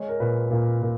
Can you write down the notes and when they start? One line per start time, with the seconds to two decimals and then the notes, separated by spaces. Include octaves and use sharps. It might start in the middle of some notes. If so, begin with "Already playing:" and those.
Already playing: G#3 C#5
0.09 A#4
0.20 A#2 B4
0.51 A#2
0.82 A#2